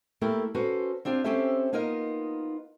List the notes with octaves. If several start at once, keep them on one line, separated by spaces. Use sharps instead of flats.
A3 A#3 E4 G4 A4 A#4
C#4 F#4 A4 B4 C5
C4 D4 F4 G4
C4 C#4 G4 A4 C5 E5
A#3 B3 D#4 F4 A#4 D#5